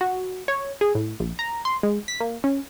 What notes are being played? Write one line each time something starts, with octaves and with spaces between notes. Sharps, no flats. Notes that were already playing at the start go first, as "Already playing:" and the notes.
F#4
C#5
G#4
A2
A#1
A#5
C6
G#3
B6
A#3
C#4